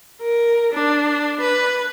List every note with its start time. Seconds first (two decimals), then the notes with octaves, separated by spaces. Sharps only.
0.22 A#4
0.73 D4
1.40 B4